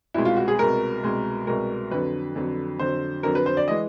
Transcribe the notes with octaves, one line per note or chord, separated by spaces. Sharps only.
C2 B2 G#3 E4
F4
F#4
G#4
C2 B2 G#3 A#4
C2 B2 G#3
C2 B2 G#3 A#4
F2 D3 F#3 B4
F2 D3 F#3
F2 D3 F#3 C5
F2 D3 F#3 A#4
B4
C5
D5
E3 G#3 D#5